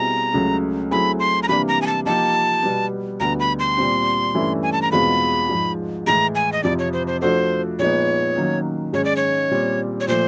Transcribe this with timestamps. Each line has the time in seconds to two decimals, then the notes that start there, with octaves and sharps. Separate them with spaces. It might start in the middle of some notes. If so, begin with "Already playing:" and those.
Already playing: B2 G3 C4 E4 G#4 A#5
0.33 C#2 C#3 F#3 A3
0.91 F#3 A3 C4 E4 G#4 B5
1.20 C6
1.43 A#5
1.48 C3 E3 G3 A#3 D4 B5
1.68 A#5
1.82 G#5
1.87 A5
2.06 F3 A#3 D#4 G4 A5
2.63 B2 G3 B3
3.20 D2 D3 G3 B3 A#5
3.40 B5
3.59 C6
3.78 A#2 G3 C4
4.35 G2 E3 A3 C#4 E4
4.63 G#5
4.72 A5
4.82 A#5
4.92 E2 B2 G#3 C4 F4 B5
5.49 G#2 F3 G#3
6.07 A2 E3 G#3 A#5
6.35 G#5
6.52 D#5
6.63 F2 C3 F3 D5
6.79 C#5
6.93 C5
7.07 C5
7.21 F3 A3 D4 F#4 A4 C5
7.79 A#2 F3 G#3 B3 D#4 C#5
8.36 D#3 F#3 A#3 C#4
8.93 G#2 D#3 G#3 C#4 C#5
9.05 D5
9.16 C#5
9.51 A#2 G3 C4
10.00 C#5
10.08 A#2 F3 A3 C5